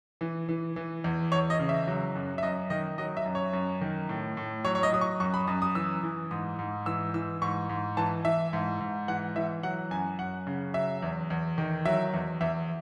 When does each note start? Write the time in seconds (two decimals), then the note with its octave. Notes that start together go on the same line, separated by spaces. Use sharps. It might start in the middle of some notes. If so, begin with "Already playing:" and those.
0.21 E3
0.49 E3
0.76 E3
1.04 E2
1.32 E2 C#5
1.50 D#5
1.59 C#3
1.69 E5
1.87 F#3
2.15 F#2
2.38 E5
2.43 F#2 D#5
2.70 D#3 D#5
2.98 F#3 D#5
3.17 E5
3.25 F#2
3.35 C#5
3.53 F#2
3.81 D#3
4.09 A2
4.37 A2
4.65 F#3 C#5
4.75 C#5
4.83 D#5
4.92 F#3 D#6
5.01 C#6
5.20 F#2 C#6
5.34 B5
5.48 F#2 D#6
5.62 D#6
5.75 E3 E6
6.03 E3
6.31 G#2 D#6
6.59 G#2
6.86 E3 E6
7.14 E3 E6
7.42 G#2 C#6
7.69 G#2
7.97 E3 A5
8.25 E3 E5
8.53 G#2
8.80 G#2
9.08 E3 F#5
9.36 E3 E5
9.63 F#3 F#5
9.91 F#2 G#5
10.19 F#2 F#5
10.47 C#3
10.74 F#3 E5
11.02 E2
11.30 E2
11.58 D#3
11.85 F#3 E5
12.14 E2
12.41 E2 E5